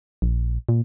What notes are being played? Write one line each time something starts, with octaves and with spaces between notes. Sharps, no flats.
A#1
A#2